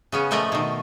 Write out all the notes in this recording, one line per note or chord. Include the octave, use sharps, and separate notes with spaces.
C#3 B3 C#4
A#2 F3 A3 D5 D#5 A#5
B2 D#3